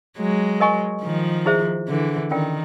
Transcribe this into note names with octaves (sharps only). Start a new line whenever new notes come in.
F#3 G#3
A#4 D#5 G#5 C#6
D#3 F3
E4 G#4 C5 E5
D3 E3
D#3 C#4 F4 A#4 D5 G5